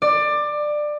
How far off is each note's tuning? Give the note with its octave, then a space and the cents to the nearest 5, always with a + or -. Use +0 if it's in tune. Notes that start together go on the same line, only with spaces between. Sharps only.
D5 +20